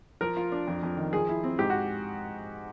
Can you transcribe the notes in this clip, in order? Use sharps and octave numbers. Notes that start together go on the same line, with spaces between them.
F3 A#4
F4
D4
F2
F2
D#3
F3 G#4
E4
C4
G#2 G4
F#4